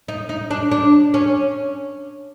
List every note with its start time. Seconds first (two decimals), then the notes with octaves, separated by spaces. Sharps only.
0.08 D#4
0.29 D#4
0.51 D4
0.72 D4
1.14 C#4